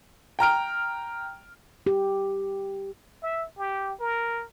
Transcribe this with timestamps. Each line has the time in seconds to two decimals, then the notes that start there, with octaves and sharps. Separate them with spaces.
0.39 G5 A#5 F6 D7
1.86 G4
3.22 E5
3.58 G4
4.00 A#4